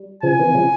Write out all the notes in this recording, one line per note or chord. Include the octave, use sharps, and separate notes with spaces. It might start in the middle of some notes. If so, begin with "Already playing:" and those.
Already playing: G3
C#3 F3 G#5
C3 E3
C#3 F3